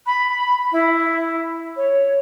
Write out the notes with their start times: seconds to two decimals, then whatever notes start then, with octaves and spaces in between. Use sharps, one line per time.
0.06 B5
0.71 E4
1.76 C#5